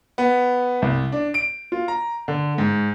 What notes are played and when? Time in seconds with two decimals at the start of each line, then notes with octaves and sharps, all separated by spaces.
0.18 B3
0.82 C2
1.12 D4
1.34 D7
1.72 F4
1.88 A#5
2.28 D3
2.58 G#2